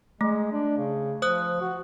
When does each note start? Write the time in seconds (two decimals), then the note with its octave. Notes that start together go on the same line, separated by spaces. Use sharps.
0.21 G#3 A3
0.52 D4
0.77 C#3
1.22 F3 C5 D#6 F#6
1.61 F#4